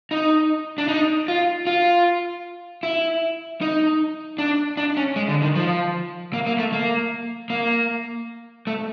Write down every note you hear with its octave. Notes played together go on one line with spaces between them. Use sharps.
D#4
D4
D#4
F4
F4
E4
D#4
D4
D4
C#4
G#3
D3
D#3
F3
A#3
A#3
A3
A#3
A#3
A3